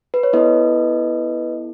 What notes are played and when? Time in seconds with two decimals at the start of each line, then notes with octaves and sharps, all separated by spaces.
0.14 B4
0.23 C#5
0.33 B3 E4 A4 B4 D#5